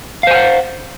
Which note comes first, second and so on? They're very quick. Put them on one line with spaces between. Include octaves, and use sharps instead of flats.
F5 C5 G#5 F#5